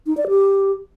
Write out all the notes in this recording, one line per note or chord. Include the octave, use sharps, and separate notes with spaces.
D#4
D5
G4